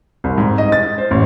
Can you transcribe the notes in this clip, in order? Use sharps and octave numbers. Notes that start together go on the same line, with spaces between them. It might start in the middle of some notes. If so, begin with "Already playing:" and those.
C2
G#2
D#5
A6
C5
A1